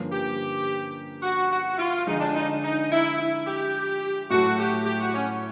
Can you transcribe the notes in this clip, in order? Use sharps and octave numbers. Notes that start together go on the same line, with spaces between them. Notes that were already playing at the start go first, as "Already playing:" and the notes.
Already playing: G2 D3 F3 A#3 C#4
G4
F#4
F#4
F4
D3 F3 G#3 D#4
D4
D#4
D#4
E4
E4
G4
A2 F#3 A3 F#4
G4
G4
F#4
C#4